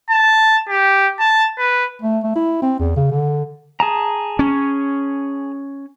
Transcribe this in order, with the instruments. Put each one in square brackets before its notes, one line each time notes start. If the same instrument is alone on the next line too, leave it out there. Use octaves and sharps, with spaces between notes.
[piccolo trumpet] A5
G4
A5
B4
[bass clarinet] A3
A3
E4
C4
E2
C#3
D3
[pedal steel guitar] G#4 A5 A#5
[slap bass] C#4